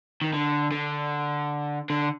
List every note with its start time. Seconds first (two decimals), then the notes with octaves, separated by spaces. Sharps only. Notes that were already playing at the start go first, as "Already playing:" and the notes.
0.22 D#3
0.33 D3
0.72 D3
1.90 D3